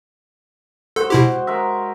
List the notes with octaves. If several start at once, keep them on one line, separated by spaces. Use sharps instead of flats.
G#3 F#4 A4 C5
B2 E4 G4
G#3 A#4 E5